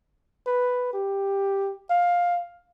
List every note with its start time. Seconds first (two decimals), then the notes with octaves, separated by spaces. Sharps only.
0.46 B4
0.93 G4
1.90 F5